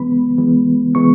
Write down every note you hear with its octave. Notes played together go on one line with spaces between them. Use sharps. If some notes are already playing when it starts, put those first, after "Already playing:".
Already playing: C#2 C#3 E3 G#3 B3 B5
C#2 C#3 E3 G#3 B3
C#3 E3 G#3 B3 C#6